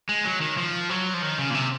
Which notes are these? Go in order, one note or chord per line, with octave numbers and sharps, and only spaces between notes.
G#3
F#3
D#3
F3
F#3
F3
D#3
C#3
A#2
C3